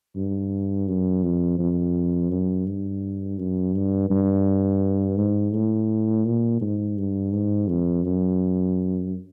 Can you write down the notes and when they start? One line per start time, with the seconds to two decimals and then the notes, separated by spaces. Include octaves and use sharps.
0.16 G2
0.88 F#2
1.23 F2
1.59 F2
2.31 F#2
2.66 G2
3.39 F#2
3.75 G2
4.10 G2
5.17 G#2
5.53 A2
6.25 A#2
6.61 G#2
6.97 G2
7.33 G#2
7.69 F2
8.04 F#2